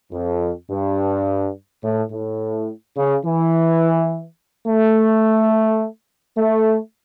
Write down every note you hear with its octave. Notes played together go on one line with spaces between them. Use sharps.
F2
G2
A2
A2
C#3
E3
A3
A3